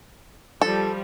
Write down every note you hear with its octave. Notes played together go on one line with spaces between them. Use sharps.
F3 G3 A4